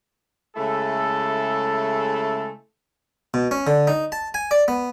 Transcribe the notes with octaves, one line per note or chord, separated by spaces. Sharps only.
C#3 G#3 A3 E4 A4
B2
C#4
D3
D#4
A5
G#5
D5
B3